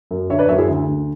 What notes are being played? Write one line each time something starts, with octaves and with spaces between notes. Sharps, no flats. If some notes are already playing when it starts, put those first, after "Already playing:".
F#2
D3 C#5 E5
B4 D5
F#2 C#5 E5
E4 G#4
D2
D2